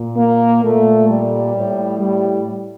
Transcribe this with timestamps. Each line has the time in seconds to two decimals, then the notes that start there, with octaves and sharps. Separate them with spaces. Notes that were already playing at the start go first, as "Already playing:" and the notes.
Already playing: A#2
0.17 A#3
0.62 A#2 A3
1.08 G3
1.54 A2
1.98 G3